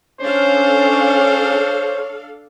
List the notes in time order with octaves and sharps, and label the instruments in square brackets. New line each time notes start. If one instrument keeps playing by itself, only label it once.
[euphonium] C#4 [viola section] D4 A4 F5 [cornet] C5 [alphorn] C#5